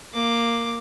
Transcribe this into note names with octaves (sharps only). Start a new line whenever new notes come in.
A#3 D6